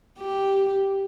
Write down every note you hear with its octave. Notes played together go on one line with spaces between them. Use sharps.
G4